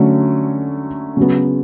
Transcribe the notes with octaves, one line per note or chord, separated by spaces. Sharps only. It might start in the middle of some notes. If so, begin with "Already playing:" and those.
Already playing: D3 F#3 A3 C#4
C#3 F#3 B3